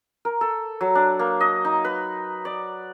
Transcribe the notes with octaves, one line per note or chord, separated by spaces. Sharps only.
A#4
A4
F#3
D4
A#3
D#5
D#4
B4
D5